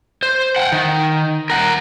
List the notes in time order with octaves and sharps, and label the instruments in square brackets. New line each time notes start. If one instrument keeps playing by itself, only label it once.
[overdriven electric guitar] C5
F#5 G5
D#3
A#4 F#5